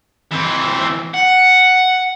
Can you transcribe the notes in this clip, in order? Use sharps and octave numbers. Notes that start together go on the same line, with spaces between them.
E3 C4
F#5